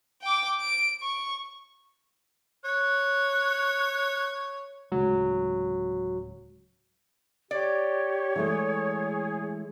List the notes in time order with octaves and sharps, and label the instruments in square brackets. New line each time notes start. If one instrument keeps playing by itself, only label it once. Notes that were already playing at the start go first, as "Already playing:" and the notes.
[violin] G5 D6
D7
C#6
[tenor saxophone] C#5 [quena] F#6
[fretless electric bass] D1 C#3 G#3 [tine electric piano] F#3
[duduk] G4 [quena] C#5 [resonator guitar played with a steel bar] D5
[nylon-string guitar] E3 G#3 A3 [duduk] G#4